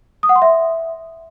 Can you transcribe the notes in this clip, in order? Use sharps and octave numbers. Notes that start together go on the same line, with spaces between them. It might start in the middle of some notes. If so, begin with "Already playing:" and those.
D#6
F#5
C6
E5